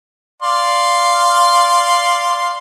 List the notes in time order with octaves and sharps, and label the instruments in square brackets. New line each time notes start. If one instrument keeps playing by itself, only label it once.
[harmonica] D5 F5 C6